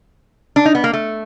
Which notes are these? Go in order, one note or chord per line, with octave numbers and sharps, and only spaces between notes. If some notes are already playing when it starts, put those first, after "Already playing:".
D4
D#4
B3
A#3
A3